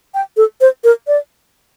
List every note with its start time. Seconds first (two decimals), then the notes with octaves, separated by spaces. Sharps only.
0.14 G5
0.37 A4
0.61 C5
0.84 A#4
1.07 D5